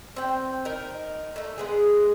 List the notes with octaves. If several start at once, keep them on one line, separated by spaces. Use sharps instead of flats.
C4 G5
D#4 A#4
A3 D#4
G#3 B3 G#4